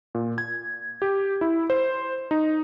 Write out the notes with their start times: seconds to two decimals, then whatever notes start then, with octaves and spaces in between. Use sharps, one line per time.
0.15 A#2
0.38 G#6
1.02 G4
1.41 E4
1.70 C5
2.31 D#4